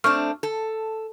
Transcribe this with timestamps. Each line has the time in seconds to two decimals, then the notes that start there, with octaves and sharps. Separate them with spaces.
0.04 A3 C4 D4 C#6 F6
0.43 A4